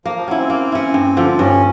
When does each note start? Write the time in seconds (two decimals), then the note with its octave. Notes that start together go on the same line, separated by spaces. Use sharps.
0.05 F3 A#3
0.16 F3
0.27 F#3 C#4 E4
0.38 C4
0.50 A#3
0.72 C#4 E4
0.94 G2
1.17 D3 F3
1.39 G2 C#4